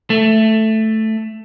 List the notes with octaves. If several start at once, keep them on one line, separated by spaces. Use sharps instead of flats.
A3